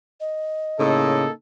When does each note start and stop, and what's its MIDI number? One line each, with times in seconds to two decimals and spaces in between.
0.20 0.94 75
0.80 1.24 45
0.80 1.26 49
0.80 1.31 58
0.80 1.31 63
0.80 1.31 69